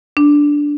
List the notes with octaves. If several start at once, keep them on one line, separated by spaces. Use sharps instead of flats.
D4